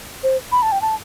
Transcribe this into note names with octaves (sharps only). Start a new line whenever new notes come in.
C5
B5
A5
G5
A5